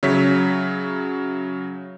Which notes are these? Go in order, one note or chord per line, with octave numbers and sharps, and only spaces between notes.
C#3 F#3 C#5 E5 B6